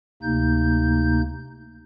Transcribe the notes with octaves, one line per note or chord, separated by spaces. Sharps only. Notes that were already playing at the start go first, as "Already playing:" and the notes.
D2 C3 A#3 D#4 G6